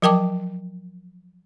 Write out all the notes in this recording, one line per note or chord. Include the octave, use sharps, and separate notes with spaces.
F3 F#3 A#4 G5 A5 D6